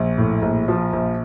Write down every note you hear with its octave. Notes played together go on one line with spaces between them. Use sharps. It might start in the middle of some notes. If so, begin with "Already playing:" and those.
Already playing: A#1
A2
A#1
F3
A#1